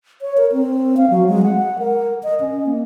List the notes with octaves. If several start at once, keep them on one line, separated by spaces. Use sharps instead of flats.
C#5
A#4
C4
F5
F#3
G#3
F#5
A#4
D#5
C#4
A#3